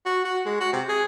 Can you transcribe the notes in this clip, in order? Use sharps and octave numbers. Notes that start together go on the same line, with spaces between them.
F#4
F#4
G#3
F#4
C3
G#4